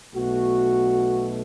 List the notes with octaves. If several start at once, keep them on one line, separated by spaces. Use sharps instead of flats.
B1 B2 A3 F#4